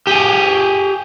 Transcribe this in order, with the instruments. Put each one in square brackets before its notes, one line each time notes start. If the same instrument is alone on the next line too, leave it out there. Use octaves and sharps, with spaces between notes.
[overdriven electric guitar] G4 G#4